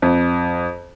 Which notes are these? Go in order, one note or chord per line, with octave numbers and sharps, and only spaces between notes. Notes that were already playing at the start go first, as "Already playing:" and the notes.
F2